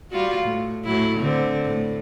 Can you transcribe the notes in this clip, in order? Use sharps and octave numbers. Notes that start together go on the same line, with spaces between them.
G3 F4 F#4
A2
A2 F#3 E4
D3 C4
A2